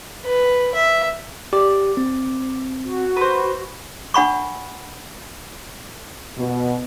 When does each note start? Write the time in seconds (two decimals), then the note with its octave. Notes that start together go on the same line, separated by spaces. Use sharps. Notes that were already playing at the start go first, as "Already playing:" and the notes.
0.25 B4
0.74 E5
1.53 G4 D5
1.97 C4
2.83 F#4
3.17 B4 C5
4.14 D4 F#5 B5 C#6
6.38 B2